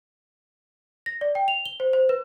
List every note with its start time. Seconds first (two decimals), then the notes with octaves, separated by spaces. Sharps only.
1.06 A#6
1.21 D5
1.35 G5
1.48 F7
1.66 G7
1.80 C5
1.93 C5
2.09 B4